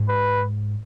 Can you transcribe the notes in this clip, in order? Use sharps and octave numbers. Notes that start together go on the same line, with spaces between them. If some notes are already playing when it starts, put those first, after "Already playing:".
Already playing: G#2
B4